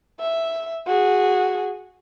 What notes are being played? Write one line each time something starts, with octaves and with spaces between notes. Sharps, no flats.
E5
F#4 G#4